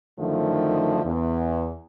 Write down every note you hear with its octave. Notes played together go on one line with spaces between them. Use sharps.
F#2 D3 D#3 F3 A3
E2